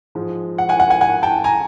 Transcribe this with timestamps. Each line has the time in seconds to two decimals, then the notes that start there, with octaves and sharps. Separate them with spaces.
0.15 G#2 F3 G#3
0.58 F#5
0.69 F#5 G#5
0.80 F#5 G#5
0.90 F#5 G#5
1.01 F#5 G#5
1.23 G5 A5
1.44 G#5 A#5